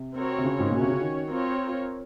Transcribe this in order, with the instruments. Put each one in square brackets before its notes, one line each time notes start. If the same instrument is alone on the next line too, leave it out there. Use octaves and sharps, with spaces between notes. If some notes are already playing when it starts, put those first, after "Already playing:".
Already playing: [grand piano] C3
[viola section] C4 F#4 A#4 C#5
[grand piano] C3
C#3
G#2
[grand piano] A#2 [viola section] C#4 F#4 C#5
[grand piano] C3
C#3
D#3
[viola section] C4 F4 A#4 C#5